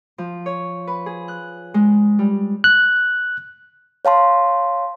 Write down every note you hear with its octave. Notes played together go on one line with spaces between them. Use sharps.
F3
C#5
B4
G#4
F#6
G#3
G3
F#6
C#5 F5 A5 C6